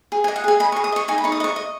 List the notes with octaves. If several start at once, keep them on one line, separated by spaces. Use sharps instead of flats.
G#4
G#5
D#5
F#5
G#4 G#5
D#5 B5
C#6
G#4
D#6
D#5 C#6
D#4 G#5
B5
D#4 C#6
D#6
D#5 C#6
D#5